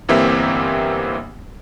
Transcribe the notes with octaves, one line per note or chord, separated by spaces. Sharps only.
G1 E3 A#3 C4 G4 E5